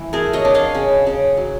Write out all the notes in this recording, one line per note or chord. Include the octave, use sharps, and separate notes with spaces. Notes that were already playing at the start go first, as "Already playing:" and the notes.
Already playing: E3
A3 G#4 A#4
C#5 D#5
D4
D#5 F5
C#3
C#3
F#3